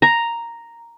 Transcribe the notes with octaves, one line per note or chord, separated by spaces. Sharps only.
A#5